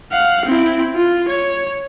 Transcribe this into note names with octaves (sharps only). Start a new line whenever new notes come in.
F5 F#5
C4 E4
F4
C#5